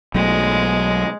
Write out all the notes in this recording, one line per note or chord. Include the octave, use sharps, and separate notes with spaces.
B1 F#3 G#3 A3